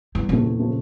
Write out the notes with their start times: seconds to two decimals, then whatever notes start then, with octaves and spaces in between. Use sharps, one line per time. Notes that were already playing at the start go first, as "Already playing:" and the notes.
0.15 E2 G2
0.29 A#2 C#3 F3 A3
0.44 E2
0.59 C#3 F3 A3